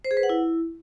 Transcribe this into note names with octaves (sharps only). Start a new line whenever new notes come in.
C5
G#4
B4
F#5
E4